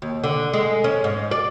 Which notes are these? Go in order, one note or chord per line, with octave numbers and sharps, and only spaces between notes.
D#2
D3
G#3
C#4
G#2
D5